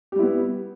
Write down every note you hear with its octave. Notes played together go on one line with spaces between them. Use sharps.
G3 B3 E4 G4